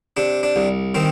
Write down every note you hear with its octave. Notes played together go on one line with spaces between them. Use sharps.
C3 D4
D4
C2
D#3 C4